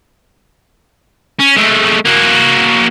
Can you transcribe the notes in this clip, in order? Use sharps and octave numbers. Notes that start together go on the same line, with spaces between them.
C#4
G#3 A3
A#3 F#4